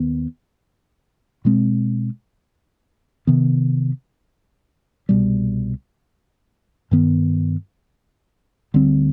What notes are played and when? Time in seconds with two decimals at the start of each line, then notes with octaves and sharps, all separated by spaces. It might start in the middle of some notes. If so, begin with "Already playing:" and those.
Already playing: D#2 D#3 B3
1.45 B2 G#3 C4
3.27 C3 D#3 B3
5.09 C2 B2 G3
6.91 G2 D#3 B3
8.74 D2 D3 G3 C4